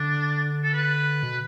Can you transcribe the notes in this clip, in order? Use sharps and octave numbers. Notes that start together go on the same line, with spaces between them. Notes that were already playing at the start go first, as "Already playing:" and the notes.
Already playing: D3 D4
A4
B4
B2